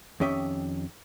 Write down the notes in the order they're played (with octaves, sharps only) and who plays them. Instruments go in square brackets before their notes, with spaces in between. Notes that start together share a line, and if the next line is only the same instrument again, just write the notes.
[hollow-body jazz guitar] F2 D#3 C#4 G4 D#5 E5